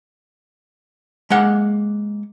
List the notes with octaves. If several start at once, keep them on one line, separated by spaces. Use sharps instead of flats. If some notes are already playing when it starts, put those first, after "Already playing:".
G#3 A#3 F#5